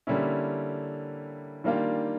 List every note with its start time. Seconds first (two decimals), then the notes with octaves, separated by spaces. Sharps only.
0.07 D3 G3 A#3 C#4 E4
1.64 D#3 G3 A#3 D4 F4